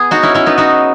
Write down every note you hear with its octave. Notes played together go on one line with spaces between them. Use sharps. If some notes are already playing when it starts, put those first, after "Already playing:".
Already playing: B3 G#4
D#4 F#4
C#4 E4
C#4 E4
B3 D#4
D#4 F#4